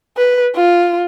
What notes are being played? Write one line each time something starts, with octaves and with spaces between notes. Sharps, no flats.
B4
F4